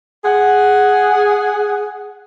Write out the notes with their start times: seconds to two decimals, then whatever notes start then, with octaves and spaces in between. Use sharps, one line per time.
0.25 G#4 F#5